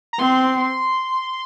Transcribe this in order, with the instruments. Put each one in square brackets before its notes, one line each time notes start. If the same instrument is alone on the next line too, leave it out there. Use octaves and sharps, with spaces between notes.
[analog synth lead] A#5
[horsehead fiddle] C4 [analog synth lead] C6